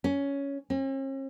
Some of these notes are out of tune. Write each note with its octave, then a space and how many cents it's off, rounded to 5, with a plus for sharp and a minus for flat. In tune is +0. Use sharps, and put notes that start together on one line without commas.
C#4 +10
C#4 -45